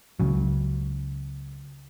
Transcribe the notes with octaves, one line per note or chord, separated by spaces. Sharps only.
C#2 C#3 F#3